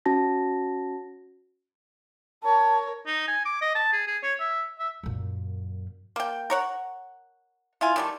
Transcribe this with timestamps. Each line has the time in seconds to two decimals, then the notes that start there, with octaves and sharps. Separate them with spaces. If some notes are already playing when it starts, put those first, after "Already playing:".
0.06 C#4 F#4 A5 A#6
2.43 A#4 C#5 A5
3.07 D#4
3.28 G#5
3.45 D6
3.61 D#5
3.75 A5
3.93 G#4
4.07 G#4
4.23 C#5
4.40 E5
4.79 E5
5.03 F#2 A#2
6.16 A#3 G5
6.50 A#4 C#5 F#5
7.81 E4 F4 G#5
7.96 D#3 G3 A3